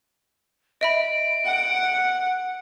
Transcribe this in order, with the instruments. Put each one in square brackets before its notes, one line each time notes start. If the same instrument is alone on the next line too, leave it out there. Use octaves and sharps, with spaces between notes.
[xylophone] D#5 E5 B5 [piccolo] D7
[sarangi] F#5